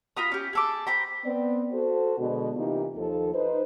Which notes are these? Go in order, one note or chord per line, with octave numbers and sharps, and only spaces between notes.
F4 A#5 B5 D#6
C#4 G4
G#4 A4 D6
C5 G5 A#5 B5
B3 C4 D5
F#4 A4 C5
B2 D3 G#3
C3 E3 A#3 D#4 F4 G4
D#2 F3 A4
D#4 B4 C5